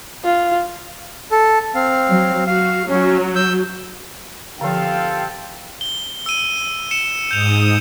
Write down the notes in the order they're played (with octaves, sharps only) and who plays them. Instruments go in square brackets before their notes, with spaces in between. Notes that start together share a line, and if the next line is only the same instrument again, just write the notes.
[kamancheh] F4
[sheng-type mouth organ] A4
C4 F5
[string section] F#3
[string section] F#4 [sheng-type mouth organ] F5
[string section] F#3 [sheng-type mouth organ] C#4
[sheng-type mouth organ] E6 G6
[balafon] D3 F3 [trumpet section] C4 F4 A4 [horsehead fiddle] G4 [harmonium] F5
[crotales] G7
E6 D#7
C#7 E7
[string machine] G#2 D#6 [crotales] G6 F7